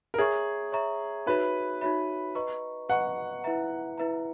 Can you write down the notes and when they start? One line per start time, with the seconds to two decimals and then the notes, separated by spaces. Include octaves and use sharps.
0.14 A#4
0.18 G#4 C#5 E5 A#5 C#6
0.72 C#5 E5 A#5 C#6
1.26 D#4 F#4 B4 C#5 E5 B5
1.81 D#4 F#4 C#5 E5 B5
2.35 B4 D#5 A#5 C#6
2.89 B4 D#5 F#5 A#5 C#6
3.44 E4 B4 E5 A#5
3.98 E4 B4 E5 A#5